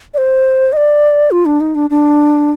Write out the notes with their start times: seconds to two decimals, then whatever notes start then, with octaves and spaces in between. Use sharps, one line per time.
0.14 D5
0.18 C5
0.73 D#5
0.77 D5
1.31 F4
1.46 D4
1.61 D#4
1.75 D4
1.90 D4